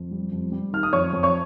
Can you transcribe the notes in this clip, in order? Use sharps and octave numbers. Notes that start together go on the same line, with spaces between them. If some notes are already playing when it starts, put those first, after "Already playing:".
Already playing: F2
G3
F2
G3
D#3 F6
D#6
F2 C#5 C#6
F2
C#5 C#6